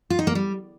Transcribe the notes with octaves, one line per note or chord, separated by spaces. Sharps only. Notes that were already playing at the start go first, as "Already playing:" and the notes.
F4
D#4
A#3
G3